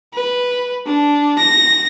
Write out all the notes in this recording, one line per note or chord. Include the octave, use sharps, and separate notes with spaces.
B4
D4
A#6